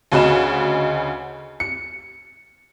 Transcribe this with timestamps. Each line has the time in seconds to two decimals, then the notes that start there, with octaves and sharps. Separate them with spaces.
0.12 D2 C#3 F#4 D#5 B5 E7
1.60 C#7